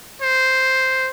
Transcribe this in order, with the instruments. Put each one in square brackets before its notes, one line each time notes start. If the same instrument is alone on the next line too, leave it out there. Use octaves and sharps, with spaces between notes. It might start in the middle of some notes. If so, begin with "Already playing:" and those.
[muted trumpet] C5